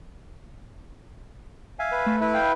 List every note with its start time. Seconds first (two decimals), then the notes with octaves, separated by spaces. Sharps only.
1.79 E5 F5 G#5
1.92 B4
2.06 A3
2.21 E4 B4
2.34 F5 G5